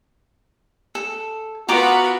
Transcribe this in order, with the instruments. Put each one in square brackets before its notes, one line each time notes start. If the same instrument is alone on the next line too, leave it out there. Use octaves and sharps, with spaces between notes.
[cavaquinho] A4
[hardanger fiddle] B3 B4 [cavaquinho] F4 A#5 D6 [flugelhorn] F#4